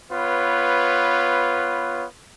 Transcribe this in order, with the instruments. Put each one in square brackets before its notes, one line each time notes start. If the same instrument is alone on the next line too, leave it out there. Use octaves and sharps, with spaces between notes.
[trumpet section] B3 F4 B4 C#5